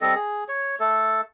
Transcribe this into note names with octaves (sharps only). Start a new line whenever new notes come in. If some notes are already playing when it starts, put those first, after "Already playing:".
G3 C4 A4 D#5
G#4
C#5
A3 A4